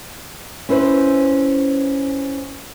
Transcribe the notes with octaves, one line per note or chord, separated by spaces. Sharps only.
C#4 E4 B4 C5